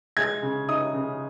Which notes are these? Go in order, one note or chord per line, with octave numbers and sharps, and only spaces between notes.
G#3 G#6
C#3
D#4 D#6
C#3